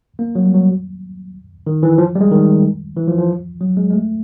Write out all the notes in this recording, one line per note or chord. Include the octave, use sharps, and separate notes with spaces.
A#3
F#3
G3
F#3
D#3
E3
F3
G3
G#3
D#3
E3
F3
F3
F#3
G#3
G#3
A3